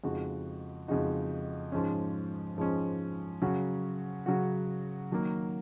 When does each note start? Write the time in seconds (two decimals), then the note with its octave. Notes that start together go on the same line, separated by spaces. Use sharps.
0.03 F2 C#3 G#3 D#4 F#4
0.88 F2 C#3 G#3 D#4 F#4
1.72 G#2 F3 G#3 C#4
2.57 G#2 F3 G#3 C#4
3.42 C#3 F#3 C#4 F#4
4.26 C#3 F#3 C#4 F#4
5.12 D#3 F#3 A#3